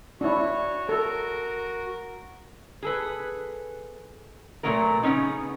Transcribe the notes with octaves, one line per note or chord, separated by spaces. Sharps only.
D4 E4 F#4 C#5
A4 A#4
G#4 A4 B4
A#2 F3 F#3 A3 B3 A#4
C#3 B3 C#4 D#4